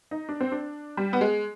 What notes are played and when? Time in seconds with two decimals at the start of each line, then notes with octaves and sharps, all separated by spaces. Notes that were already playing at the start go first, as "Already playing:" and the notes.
0.11 D#4
0.29 D4
0.40 C4
0.52 D4
0.97 G3
1.13 B3
1.21 G#3